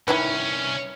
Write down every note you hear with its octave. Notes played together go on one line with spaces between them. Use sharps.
C2 D#3 C#4 E4 B4